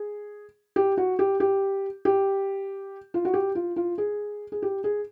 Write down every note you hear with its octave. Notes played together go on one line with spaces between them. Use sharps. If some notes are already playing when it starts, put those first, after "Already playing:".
Already playing: G#4
G4
F#4
G4
G4
G4
F4
F#4
G4
F4
F4
G#4
G#4
G4
G#4